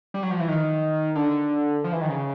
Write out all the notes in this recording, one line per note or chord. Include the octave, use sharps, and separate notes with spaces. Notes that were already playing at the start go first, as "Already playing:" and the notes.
G3
F#3
F3
E3
D#3
D3
F3
E3
D#3
C#3